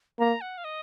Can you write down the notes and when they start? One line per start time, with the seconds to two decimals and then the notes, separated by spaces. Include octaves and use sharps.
0.19 A#3 A#5
0.41 F#5
0.58 F5
0.64 D#5